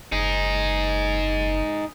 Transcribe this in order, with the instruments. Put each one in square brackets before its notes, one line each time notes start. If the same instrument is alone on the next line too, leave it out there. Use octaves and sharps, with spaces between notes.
[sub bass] F#1 [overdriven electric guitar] D#4 G#4